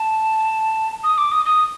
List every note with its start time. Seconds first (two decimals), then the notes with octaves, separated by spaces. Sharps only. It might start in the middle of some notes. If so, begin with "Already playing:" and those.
Already playing: A5
1.04 D#6
1.18 D6
1.32 D#6
1.45 D#6